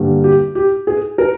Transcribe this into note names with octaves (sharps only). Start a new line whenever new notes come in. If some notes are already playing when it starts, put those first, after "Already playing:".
Already playing: G2 D3 G3 A#3
G4
G4
G#4
A#4